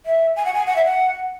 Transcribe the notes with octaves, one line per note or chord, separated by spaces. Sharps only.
E5
G#5
F#5
G#5
F#5
E5
F#5